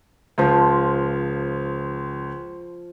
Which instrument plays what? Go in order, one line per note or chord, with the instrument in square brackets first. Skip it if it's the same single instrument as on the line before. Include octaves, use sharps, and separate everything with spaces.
[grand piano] C#2 [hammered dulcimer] F3 C5